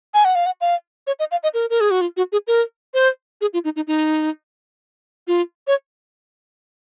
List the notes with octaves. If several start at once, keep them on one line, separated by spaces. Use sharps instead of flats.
G#5
F#5
F5
F#5
F5
C#5
D#5
F5
D#5
A#4
A#4
G#4
F#4
F4
F#4
G#4
A#4
C5
G#4
F4
D#4
D#4
D#4
F4
C#5